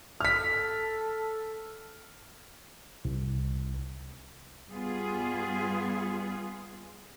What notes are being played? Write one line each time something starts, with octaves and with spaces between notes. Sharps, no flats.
A4 F6 B6
C2
G2 G3 B3 F4 G#4